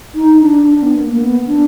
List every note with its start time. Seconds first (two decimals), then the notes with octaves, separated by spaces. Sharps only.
0.15 D#4
0.41 D4
0.68 D4
0.82 B3
0.94 A#3
1.11 A#3
1.20 B3
1.47 D4